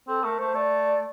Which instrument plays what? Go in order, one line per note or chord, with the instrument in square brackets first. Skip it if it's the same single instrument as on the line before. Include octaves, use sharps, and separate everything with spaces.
[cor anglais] C4 [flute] A4
[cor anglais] A3 [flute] A#4
[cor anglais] A3 [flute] C5
[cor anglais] A3 [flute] D5